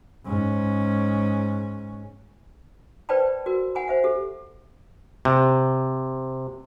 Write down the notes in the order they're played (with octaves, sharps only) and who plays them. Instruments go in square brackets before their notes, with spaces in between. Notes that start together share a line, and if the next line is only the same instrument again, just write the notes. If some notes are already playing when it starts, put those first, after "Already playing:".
[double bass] G#2 C#4
[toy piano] B4 C5 D5 G5 A5 B5
F#4 A#4
F#5 G#5 B5
C5 E5 F#5
G4 A4
[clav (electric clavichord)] C3